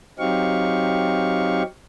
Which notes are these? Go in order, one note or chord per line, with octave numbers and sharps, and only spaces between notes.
F#3 C4 D#4 G4 F5 C#6